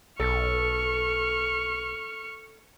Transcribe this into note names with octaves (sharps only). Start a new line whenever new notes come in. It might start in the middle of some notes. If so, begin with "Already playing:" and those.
B1 A4 C#6 F6